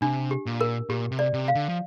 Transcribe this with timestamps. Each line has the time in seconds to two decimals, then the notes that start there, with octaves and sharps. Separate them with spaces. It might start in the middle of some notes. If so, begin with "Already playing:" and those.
0.02 C3 D4
0.31 G4
0.46 A#2
0.61 A#4
0.89 A#2 G4
1.12 C3
1.19 D5
1.33 C3
1.48 F5
1.55 D3
1.69 F3